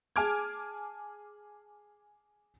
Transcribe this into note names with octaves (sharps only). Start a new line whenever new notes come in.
G#4 G#5 A5 D6 F6 G#6